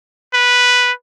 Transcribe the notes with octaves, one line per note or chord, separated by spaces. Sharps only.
B4